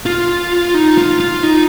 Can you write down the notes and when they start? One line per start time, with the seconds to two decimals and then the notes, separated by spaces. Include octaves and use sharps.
0.06 F4
0.74 D#4
0.98 F4
1.20 F4
1.43 D#4